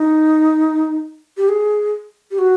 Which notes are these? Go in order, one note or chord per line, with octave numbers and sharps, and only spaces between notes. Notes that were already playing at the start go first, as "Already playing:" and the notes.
Already playing: D#4
G4
G#4
G4
F#4